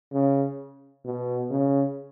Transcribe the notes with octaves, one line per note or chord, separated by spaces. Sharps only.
C#3
B2
C#3